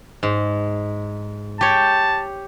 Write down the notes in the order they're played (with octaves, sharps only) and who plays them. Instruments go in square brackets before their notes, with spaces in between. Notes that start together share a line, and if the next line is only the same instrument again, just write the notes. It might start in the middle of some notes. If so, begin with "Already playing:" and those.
[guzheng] G#2
[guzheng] G4 C#5 [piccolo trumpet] A5